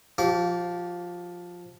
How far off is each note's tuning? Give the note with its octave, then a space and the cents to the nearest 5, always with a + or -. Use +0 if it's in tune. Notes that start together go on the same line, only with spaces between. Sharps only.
F3 +10 G4 -20 D6 -35